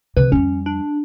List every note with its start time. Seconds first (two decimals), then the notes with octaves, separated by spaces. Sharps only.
0.17 C3 F3 B4
0.32 F2 G3 C#4
0.66 D4